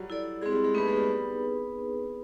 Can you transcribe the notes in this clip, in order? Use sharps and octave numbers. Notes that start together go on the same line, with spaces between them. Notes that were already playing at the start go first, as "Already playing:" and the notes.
Already playing: F#3 G3
E4 A4 D5
G#3 C4 E4 G#4
G3
G#3
A3 B3 D#4 G#4 B4
G#3
G3